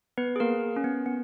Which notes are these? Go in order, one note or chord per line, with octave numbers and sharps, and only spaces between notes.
B3 B4
G#4
A#3 A#4
C#4
B3
B3